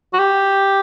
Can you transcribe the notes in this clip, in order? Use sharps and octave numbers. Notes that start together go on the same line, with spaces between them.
F#4
G4